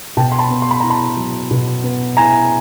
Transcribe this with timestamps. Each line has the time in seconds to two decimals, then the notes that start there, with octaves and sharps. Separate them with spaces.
0.17 B2 G5 A5
0.32 C6
0.39 A5 B5
0.50 B3
0.62 C6
0.71 B5
0.80 E4 A#5
0.90 A5 B5
1.17 F#3
1.51 B2
1.84 B3
2.17 E4 G#5 A#5